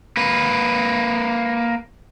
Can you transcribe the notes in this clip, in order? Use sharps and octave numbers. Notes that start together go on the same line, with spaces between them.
A#3 B4